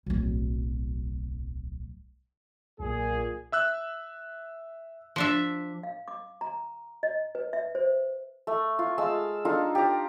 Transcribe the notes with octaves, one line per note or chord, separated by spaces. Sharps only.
D1 B1
B1 A#2 G#4
E5 E6 F#6
F3 D4 E5
F5
D6
A#5
D#5
B4
E5
C5
A3
F4
G#3 F5 A5 E6
D4 D#4 F4 A4
G4 A#5